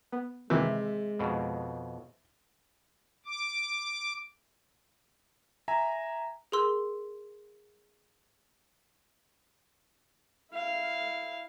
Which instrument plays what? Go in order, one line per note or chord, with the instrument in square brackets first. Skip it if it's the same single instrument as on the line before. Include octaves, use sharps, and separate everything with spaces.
[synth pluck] B3
[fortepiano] C3 E5 [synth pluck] D#3 E3 [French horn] G#3
[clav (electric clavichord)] F2 B2
[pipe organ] D6
[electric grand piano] E5 G#5 A#5
[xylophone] G#4 A#4 C6 E6
[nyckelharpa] E4 F5